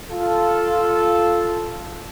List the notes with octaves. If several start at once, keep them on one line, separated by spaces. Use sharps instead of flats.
F4 A4